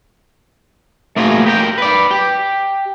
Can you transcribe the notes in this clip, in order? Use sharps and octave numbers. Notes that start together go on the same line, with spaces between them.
A3 A#3 F4 F#4 G#4 A#4
G4 A#4 G5
B4 D5
G4